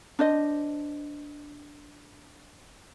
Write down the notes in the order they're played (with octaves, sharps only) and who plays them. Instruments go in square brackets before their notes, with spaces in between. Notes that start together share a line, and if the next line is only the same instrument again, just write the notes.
[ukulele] D4 C5 D#5